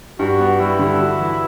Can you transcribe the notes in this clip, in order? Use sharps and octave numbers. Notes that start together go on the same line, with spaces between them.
G2 F#4
B3
G3 E4
D3
F#4
E3